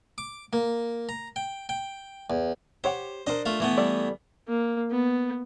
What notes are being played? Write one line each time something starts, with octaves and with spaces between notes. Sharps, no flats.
D6
A#3
A#5
G5
G5
E2
G4 C5 C#5 F#5
D4 A#4 C5 D#5
A3 F4
E3 A3 B3
G3 A4 D5
A#3
B3